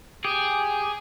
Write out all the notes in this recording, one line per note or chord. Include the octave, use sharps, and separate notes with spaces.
G4 G#4